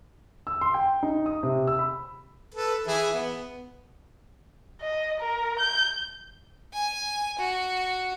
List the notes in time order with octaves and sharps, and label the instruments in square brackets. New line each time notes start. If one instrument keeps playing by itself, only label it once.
[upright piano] E6
C6
G5
D#4
D#6
C3
E6
B5
[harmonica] A4 B4
E3 E4 G#4
B3
[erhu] D#5
A#4
G6
[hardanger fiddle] G#5
F#4